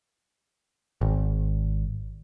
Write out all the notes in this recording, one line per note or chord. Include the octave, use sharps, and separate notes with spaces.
G#1